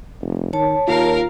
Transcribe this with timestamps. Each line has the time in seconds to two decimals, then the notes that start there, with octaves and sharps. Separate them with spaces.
0.21 F1
0.53 D#3 C#5 A5
0.88 D#2 F4 A#4 F5